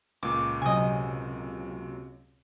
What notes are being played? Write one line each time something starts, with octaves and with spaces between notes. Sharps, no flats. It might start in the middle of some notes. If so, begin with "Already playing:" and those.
C#2 A#2 D6
C3 F#3 D#5 G#5